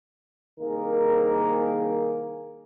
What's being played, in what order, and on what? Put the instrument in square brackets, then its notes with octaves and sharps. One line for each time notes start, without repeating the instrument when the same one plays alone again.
[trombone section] C2 D#3 A#3 G#4 A#4